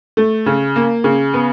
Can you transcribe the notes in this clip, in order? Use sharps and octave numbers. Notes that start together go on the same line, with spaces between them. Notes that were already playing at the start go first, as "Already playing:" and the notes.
A3
C#3
A#3
C#3
B3